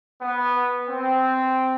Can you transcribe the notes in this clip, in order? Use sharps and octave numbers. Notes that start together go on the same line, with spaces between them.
B3
C4